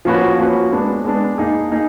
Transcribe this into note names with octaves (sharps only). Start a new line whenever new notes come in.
F3 A#3 C#4 F#4 B4
F3 A#3 C#4 F#4 B4
G#3 B3 D4
G#3 B3 D4
A#3 D#4 G#4
A#3 D#4 G#4